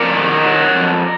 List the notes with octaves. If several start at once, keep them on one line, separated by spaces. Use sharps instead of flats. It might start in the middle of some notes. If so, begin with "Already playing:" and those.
Already playing: F2 A#4 D5
D#3
F#3
F2